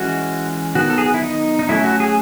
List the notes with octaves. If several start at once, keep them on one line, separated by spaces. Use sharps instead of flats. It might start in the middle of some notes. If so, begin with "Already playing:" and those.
Already playing: E3 G#3 C#4 F#4
D#3 F#3 B3 F#4
A4
G#4
F#4
E4
D#4
D#4
F#3 A3 C#4 E4
F#4
G#4